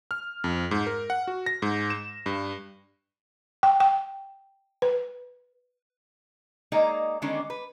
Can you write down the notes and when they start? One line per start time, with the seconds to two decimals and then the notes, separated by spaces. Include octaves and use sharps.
0.11 F6
0.44 F2
0.71 G#2
0.87 A#4
1.10 F#5
1.27 F#4
1.46 A#6
1.62 G#2
1.90 E7
2.26 G2
3.63 G5
3.80 G5
4.82 B4
6.72 G#3 A#3 D#4 G#4 D5 D#5
7.22 D3 D#3 G#3 B3 C#4 D4
7.50 B4